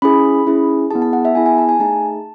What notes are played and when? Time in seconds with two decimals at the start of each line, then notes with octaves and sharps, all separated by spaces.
0.02 C#4 E4 G#4 B5
0.47 C#4 E4 G#4
0.91 B3 E4 G#4 A5
1.02 A5
1.13 F#5
1.25 E5
1.35 B3 E4 G#4 G#5
1.46 G#5
1.58 A5
1.69 G#5
1.80 A3 D#4 G#4 A5